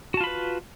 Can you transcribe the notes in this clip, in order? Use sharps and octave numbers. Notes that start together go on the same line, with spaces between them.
F4 F#4 B4 A5 B5